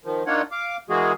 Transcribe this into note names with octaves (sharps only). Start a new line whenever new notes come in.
D#3 F3
A#3 D4 D#4 F4 C#5 F#5
F5 D6
E3 G#3 A#3 F#4 G#4